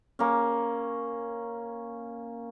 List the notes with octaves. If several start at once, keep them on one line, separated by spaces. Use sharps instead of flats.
A#3 C#4